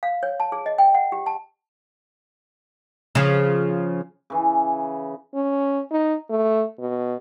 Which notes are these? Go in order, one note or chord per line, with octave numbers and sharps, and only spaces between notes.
F5
C#5
A5
G#4
D#5
G5
F#5
G4
A5
C#3 F3
C#3 E3
C#4
D#4
A3
B2